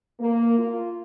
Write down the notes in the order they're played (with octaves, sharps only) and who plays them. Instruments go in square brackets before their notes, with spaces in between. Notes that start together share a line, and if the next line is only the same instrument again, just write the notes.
[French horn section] A#3
F4